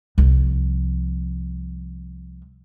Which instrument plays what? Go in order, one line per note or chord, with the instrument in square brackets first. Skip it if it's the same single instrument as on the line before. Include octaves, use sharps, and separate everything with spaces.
[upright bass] C2 F3